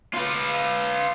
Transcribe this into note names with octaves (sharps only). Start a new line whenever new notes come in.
F4 B4